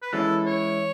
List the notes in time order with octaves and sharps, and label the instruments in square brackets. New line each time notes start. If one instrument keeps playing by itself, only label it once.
[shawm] B4
[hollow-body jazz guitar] E3 G#3 C#4 E4 [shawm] A4
[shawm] C#5